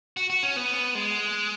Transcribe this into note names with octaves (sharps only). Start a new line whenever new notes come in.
F#4
F#4
C#4
B3
G#3